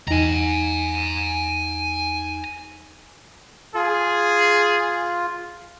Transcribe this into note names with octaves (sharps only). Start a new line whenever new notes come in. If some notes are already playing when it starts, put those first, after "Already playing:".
E2 D#4 G#5 A#5
F4 G#4